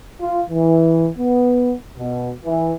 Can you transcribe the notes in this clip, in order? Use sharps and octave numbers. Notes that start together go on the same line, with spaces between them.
F4
E3
B3
B2
E3